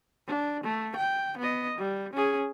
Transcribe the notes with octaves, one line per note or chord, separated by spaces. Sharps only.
D4
A3
G5
B3 D#5
G3
C#4 G#4